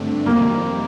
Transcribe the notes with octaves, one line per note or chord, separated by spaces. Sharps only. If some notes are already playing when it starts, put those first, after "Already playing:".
Already playing: G2 D3 A3 C4 D4
F2 C3 D#3 G3 A#3 C4